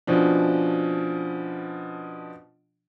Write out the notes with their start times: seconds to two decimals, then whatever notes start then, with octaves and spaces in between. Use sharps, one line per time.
0.07 B2 F3 C#4 D4